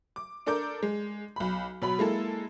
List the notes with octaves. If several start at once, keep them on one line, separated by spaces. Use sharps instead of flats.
D6
D4 A4 A#4 D6 G6
G#3
B1 B5
B2 F#3 B5
G#3 A#3 E4 A4